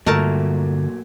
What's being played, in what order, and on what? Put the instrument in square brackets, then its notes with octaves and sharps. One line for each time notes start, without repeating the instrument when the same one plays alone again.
[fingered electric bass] G2 G3 [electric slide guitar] A#2 F#3 [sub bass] D3 [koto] A3 A#4 A5